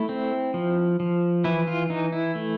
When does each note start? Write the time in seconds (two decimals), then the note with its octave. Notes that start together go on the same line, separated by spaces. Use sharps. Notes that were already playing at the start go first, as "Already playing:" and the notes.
Already playing: A3 E4
0.09 C4
0.54 F3
1.00 F3
1.44 E3 E4
1.67 F4
1.90 E3 D#4
2.12 E4
2.35 A3